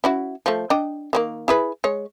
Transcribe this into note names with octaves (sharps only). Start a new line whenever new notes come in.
C#4 E4 F#4
F3 A3
D4 D#5 G5
D#3 G3 A#3
E4 G#4 B4
G#3 C#5